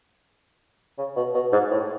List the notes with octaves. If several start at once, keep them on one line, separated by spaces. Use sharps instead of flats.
C#3
B2
B2
G#2
A2